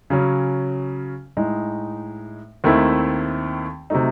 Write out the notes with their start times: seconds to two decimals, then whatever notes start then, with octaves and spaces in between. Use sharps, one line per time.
0.10 C#3 F#3 C#4
1.37 A2 G#3 D#4
2.64 D#2 D#3 A3 C4 E4
3.90 C3 F#3 A3 D#4